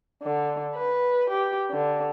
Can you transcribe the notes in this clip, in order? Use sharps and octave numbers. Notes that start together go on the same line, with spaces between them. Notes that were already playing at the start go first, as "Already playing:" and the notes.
D3
B4
G4
D3